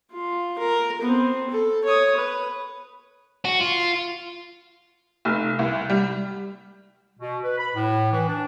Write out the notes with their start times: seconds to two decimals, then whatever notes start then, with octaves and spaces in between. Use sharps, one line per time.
0.12 F4
0.58 A#4
1.01 B3 C4
1.50 A4
1.84 C#5 D#6
2.17 B4
3.45 F#4
3.61 F4
5.25 F1
5.59 C2
5.90 G3
7.20 B2
7.44 B4
7.58 B5
7.75 A2
8.12 E3
8.28 D4